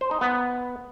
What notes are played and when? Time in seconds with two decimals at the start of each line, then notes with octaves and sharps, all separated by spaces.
0.01 C5
0.11 D#4
0.21 B3